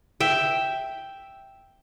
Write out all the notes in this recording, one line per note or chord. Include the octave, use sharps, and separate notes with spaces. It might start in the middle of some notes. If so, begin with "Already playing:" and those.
E5 G5